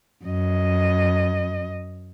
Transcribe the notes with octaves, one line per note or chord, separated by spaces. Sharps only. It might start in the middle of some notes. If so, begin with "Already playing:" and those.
F#2 D#5